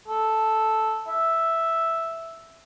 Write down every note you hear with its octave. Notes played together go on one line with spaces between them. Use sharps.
A4
E5